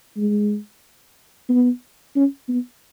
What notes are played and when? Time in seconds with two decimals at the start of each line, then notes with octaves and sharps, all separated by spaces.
0.17 G#3
1.49 B3
2.16 C#4
2.48 B3